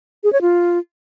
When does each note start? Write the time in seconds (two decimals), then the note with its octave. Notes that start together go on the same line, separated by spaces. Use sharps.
0.24 G#4
0.33 C#5
0.41 F4